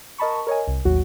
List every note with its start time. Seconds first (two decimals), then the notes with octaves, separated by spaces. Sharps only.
0.18 A#4 D#5 A5 B5 C#6
0.47 A#4 C#5 D#5 G#5
0.67 C2
0.85 A1 D#2 F#3 F#4